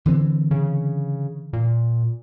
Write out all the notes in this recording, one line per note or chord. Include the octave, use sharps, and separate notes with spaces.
D3 E3 C4
C#3
A#2